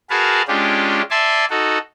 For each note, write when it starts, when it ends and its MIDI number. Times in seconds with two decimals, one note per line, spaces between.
0.10 0.42 66
0.10 0.42 68
0.10 0.42 70
0.10 0.42 71
0.10 0.42 77
0.10 0.42 81
0.48 1.02 56
0.48 1.02 61
0.48 1.02 62
0.48 1.02 65
0.48 1.02 67
1.10 1.45 74
1.10 1.45 76
1.10 1.45 80
1.10 1.45 81
1.10 1.45 84
1.50 1.78 63
1.50 1.78 66
1.50 1.78 69